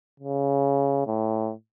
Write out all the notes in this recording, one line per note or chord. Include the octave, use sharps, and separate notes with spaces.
C#3
A2